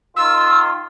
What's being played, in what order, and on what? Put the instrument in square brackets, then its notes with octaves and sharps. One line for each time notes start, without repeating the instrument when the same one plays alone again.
[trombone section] D#3 F4 [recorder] E6